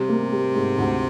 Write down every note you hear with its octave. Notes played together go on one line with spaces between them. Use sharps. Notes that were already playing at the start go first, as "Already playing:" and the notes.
Already playing: C3 G3
A#3
G3
G#2
D2